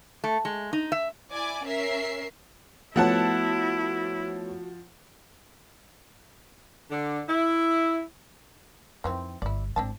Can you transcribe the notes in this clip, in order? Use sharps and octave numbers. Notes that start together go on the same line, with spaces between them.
A3
G#3
D#4
E5
E4 D5 G#5 D6
C#4 A#4 E5 C7
F3 A3 B3 E4 F#4 C#5 F#5 A5
D3
E4
F2 D#3 E3 C4
G1 E4 D5
G#1 A2 C4 D4 A5